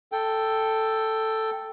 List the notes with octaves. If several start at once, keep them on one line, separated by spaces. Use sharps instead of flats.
A4 G5